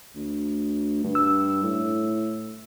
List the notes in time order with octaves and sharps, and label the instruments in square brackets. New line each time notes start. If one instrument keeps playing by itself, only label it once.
[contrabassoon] D2
G2
[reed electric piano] E6
[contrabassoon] A2